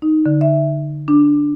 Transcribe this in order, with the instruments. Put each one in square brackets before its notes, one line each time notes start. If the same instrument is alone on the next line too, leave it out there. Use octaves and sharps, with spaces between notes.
[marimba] D#4
D3
E5
D4